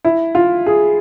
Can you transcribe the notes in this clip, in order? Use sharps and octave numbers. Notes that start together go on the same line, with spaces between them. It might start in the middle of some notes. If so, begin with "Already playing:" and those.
E4
F4
G#4